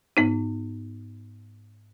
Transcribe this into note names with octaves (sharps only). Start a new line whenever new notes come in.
G#2 B3 D#4